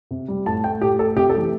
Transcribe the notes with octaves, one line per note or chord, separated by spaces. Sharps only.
C3
G3
A2 A5
A3 G5
A2 G4
A3 A4
C3 G4
A4
E3 A3 G4